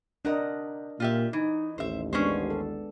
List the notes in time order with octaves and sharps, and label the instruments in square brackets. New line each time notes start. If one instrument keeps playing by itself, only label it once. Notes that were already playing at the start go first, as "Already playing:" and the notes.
[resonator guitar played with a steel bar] C3 F#5 A#5 [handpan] D4 A#4 D#5
[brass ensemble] A#2 [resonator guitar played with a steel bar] F4 G4 E5
[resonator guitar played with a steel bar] E3 [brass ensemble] D#4
[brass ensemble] A1 D#2 [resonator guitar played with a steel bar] C5 E5
[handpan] G#3 B3 D4 [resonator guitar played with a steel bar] C#4 G#4 C5
[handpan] A4